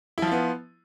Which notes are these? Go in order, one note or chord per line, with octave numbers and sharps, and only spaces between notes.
F3 B3 E4 F4